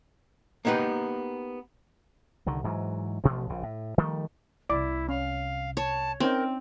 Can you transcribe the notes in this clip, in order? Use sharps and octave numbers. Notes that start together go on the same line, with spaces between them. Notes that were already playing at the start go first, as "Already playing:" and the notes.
A#3 B3 D#4 G4 B4
C2 D3 D#3
G#2 E3 F#3
A1 B2 F3 A3
A#1 C#3
A2
D#3 F3 G3 A3
C2 C3 E4 D5 D6
C#4 F5
C#5 A5
C4 C#4 D#4 A#4 G5